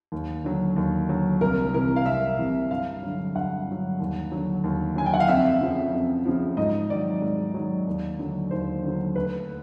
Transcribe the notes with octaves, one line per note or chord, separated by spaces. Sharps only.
D#2
D3 F#3
D#2
D3 F#3
C2 A#4
C3 E3 A#4
F5
C2 E5
C3 E3
G2 F5
D3 F#3
G2 F#5
D3 F#3
D#2
D3 F#3
D#2
D3 F#3 G#5
G5
F#5
F5
F2 E5
C#3 F3
F2
C#3 F3
G#2 D#5
D#3 F#3 D5
G#2
D#3 F#3
D#2
D3 F#3
D#2 C5
D3 F#3
D2 B4